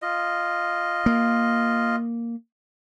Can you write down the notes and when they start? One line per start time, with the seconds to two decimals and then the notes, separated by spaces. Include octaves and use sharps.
0.02 F4 D#5
1.06 A#3